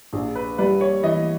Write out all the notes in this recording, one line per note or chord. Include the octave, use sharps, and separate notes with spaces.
A#1 G#4
B4
G3 B4
C#5
E3 D#5